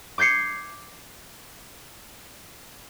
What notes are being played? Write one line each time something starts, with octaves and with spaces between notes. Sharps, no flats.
D6 G6 G#6 C7 C#7